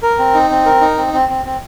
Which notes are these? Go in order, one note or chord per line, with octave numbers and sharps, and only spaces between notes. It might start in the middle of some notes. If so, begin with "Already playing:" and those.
A#4
C4
D#4
C4
A#4
D#4
C4
C4
C4
C4